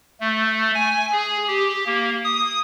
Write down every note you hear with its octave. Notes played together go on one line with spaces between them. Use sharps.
A3
G#5
G#4
G4
A#3
D#6